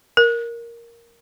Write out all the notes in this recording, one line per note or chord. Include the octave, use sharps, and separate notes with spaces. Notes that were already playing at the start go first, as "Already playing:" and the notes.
A#4